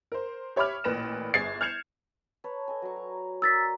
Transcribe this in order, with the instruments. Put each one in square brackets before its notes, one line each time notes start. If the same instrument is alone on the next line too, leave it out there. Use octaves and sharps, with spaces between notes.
[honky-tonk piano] A#4 C5
G4 C#5 E5 B5 D6 F6
A1 A#2 B4 A#6 E7
G1 G#4 G#6 A6 C7
F6 G6 G#6 C#7 E7 F7
[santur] B4 C#5 A5
A4 D#5 G#5
F#3 D5 C#6
A#5
[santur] A#4 D5 [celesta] E6 A6 B6